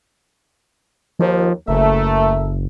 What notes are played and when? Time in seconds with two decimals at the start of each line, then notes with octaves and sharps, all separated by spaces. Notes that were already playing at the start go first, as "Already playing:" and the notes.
1.19 D#2 F3
1.68 F#1 A3 A4 A#4 E5